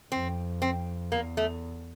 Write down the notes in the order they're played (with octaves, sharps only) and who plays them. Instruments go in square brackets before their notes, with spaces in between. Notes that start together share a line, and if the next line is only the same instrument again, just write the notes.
[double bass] F2 [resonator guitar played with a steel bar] C4
[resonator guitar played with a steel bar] C4
[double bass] E2 [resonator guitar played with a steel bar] A#3
[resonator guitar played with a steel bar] A3